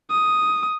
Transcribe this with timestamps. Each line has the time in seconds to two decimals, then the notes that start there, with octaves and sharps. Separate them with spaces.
0.10 D#6